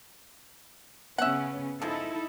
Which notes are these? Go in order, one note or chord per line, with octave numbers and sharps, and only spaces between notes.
C#3 B3 C#4 E5 F#5
F3 G#3 D#4 E4 A4